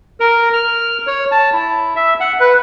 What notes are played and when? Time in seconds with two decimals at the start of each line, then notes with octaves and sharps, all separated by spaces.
0.20 A#4
0.53 F6
1.07 C#5
1.32 A5
1.53 E4
1.96 E5
2.20 F#5
2.40 B4